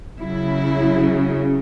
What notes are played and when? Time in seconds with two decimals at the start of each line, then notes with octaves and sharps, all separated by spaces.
0.19 C#3 F#3 E4